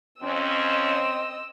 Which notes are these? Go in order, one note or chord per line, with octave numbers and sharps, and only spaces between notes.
F2 C4 C#4 D#5 E6